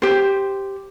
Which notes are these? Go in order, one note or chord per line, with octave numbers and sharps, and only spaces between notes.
G4 C5